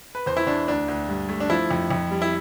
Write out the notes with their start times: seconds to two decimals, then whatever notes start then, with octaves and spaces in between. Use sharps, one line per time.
0.15 B4
0.26 E2 C5
0.37 E4
0.46 E2 D4
0.68 D2 D4
0.88 D2
1.08 G2
1.29 A3
1.40 D4
1.50 F3 E4
1.71 F2
1.90 F2
2.11 G3
2.22 E4